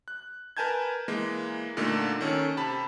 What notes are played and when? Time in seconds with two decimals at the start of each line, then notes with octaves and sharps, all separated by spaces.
0.08 F#6
0.57 A#4 B4 G#5 A5 G6 G#6
1.08 E3 G#3 A#3
1.77 A#2 D3 A3 A#3 D#4
2.21 D#3 C#4 A4
2.57 C3 A5 B5